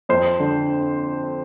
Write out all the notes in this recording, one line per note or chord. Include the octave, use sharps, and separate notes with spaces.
F2 C5
D3